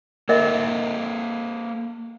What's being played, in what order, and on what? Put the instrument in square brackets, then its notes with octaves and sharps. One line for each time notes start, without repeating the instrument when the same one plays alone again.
[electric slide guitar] A#3 A4 C5 [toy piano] A#4 D#5 E5